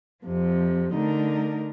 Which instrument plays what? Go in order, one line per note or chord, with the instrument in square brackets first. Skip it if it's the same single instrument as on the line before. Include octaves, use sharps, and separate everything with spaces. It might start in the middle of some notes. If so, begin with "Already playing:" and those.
[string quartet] F2 C3 F3
D3 A3 D#4 A#4